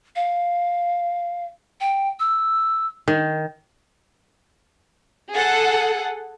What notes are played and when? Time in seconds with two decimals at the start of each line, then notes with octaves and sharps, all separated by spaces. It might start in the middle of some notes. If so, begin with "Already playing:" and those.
0.16 F5
1.81 G5
2.20 E6
3.08 D#3
5.32 G#4 A4 F#5